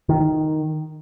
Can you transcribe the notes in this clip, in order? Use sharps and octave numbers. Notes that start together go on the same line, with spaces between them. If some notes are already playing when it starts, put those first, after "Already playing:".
D#3